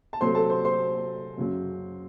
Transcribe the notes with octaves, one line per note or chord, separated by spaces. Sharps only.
A5
C3 F#3 A3 C5 C6
A4 A5
C5 C6
C5 C6
F#2 C#3 F#3